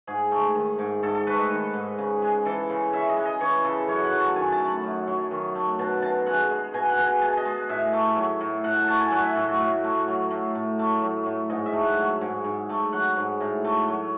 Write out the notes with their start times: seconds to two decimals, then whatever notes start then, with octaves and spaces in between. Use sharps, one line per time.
0.07 G#2 G#4
0.31 A3
0.55 D#3
0.78 G#2
1.03 G#2 A4
1.15 A4
1.27 A3 B4
1.39 D#5
1.51 D#3
1.74 G#2
1.98 C#3
2.22 G#3
2.45 E3 A4
2.70 C#3
2.93 C#3 E5
3.09 D#5
3.17 G#3
3.25 D#5
3.40 E3 C#5
3.64 C#3 A4
3.88 F#2 C#5
4.04 F#5
4.12 F#3
4.20 A5
4.36 D#3 G#5
4.52 A5
4.60 A3
4.68 B5
4.84 F#2
5.07 F#3
5.31 D#3
5.55 A3
5.79 B2 A5
6.02 B2 A5
6.26 G#3 F#5
6.50 G#3
6.74 B2 G#5
6.89 F#5
6.98 B2
7.06 G#5
7.21 G#3 A5
7.37 D#5
7.45 G#3
7.69 A2 E5
7.93 A3
8.16 F#3
8.40 A2
8.64 A2 F#5
8.76 A5
8.87 A3 A5
9.00 G#5
9.11 F#3 F#5
9.23 E5
9.36 A2 A4
9.47 F#4
9.59 A2
9.84 A3
10.08 F#3
10.30 A2
10.55 A2
10.79 A3
11.02 F#3
11.26 A2
11.49 G#2 D#5
11.66 E5
11.73 A3
11.81 F#5
11.97 F#3
12.21 G#2
12.44 G#2
12.69 A3
12.92 F#3 F#5
13.17 G#2
13.40 A2
13.64 A3
13.88 F#3